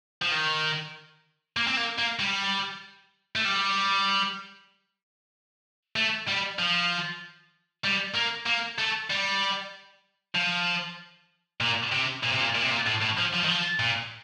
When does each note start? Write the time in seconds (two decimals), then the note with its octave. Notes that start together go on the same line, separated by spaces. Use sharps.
0.22 F3
0.32 D#3
1.57 A#3
1.68 C4
1.77 A#3
1.99 A#3
2.19 G3
3.36 A3
3.45 G3
5.96 A3
6.27 G3
6.59 F3
7.84 G3
8.15 A#3
8.47 A#3
8.78 A3
9.10 G3
10.35 F3
11.61 A#2
11.92 C3
12.23 A#2
12.32 C3
12.40 A#2
12.55 A#2
12.62 C3
12.70 A#2
12.86 A2
13.01 A2
13.17 F3
13.33 F3
13.43 D#3
13.48 F3
13.79 A#2